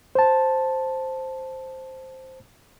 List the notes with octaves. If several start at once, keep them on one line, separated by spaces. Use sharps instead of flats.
C5 A5